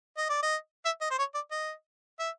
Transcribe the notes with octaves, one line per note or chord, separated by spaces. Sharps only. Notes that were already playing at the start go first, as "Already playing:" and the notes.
D#5
D5
D#5
E5
D#5
C5
C#5
D5
D#5
E5